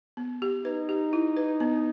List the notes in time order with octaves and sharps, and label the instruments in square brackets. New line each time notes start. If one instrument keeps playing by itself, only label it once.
[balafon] B3
G4
[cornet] D#4 [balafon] B4
[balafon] G4
E4
B4
B3